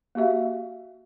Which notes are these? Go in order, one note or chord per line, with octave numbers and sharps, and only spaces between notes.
A#3 F#4 G4 E5 F5